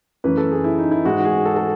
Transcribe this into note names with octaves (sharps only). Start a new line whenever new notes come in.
F#2 E3 A3 C#4 B4
A4
G#4
E4
D#4
E4
G#2 E3 G#3 F#4
F#4
G#4
A4
A4